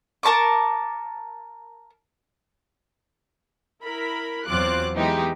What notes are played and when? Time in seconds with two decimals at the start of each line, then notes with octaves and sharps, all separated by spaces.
0.23 A#4 A5 C#6 D6
3.83 E4 A#4 B5
4.46 E2 F#3 C4 F4 D6 F#6
4.95 E3 G#3 B3 D#4 G4